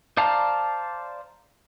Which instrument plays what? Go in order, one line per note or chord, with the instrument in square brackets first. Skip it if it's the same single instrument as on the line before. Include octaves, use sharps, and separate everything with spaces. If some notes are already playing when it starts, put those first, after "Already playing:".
[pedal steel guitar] C5 D5 F5 A5 A#5